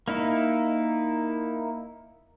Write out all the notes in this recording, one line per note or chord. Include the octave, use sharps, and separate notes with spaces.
A#3 D#4 E4